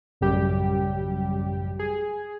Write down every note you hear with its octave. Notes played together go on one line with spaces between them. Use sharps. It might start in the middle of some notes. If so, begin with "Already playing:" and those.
A1 F#2 C#3 G3 G4
G#4